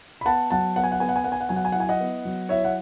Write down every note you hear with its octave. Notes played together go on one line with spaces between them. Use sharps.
B5
B3 F#5 A5
F#3 F#5 A5
B3 F#5
G#5
F#5
B3 G#5
F#5
G#5
B3 F#5
G#5
F#5
F#3 G#5
F#5
G#5
E4 F#5
G#5
D#5 F#5
B3
F#3
E4 C#5 E5
F#5